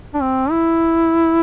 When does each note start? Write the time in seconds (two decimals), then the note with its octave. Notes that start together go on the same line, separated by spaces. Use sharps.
0.15 D4
0.22 C4
0.51 E4